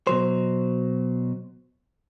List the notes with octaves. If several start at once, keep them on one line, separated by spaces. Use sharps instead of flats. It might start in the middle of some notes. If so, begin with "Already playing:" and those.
B2 F#3 C5